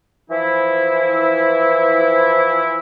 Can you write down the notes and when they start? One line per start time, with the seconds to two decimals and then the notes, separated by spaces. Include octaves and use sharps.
0.30 E3 F3 E4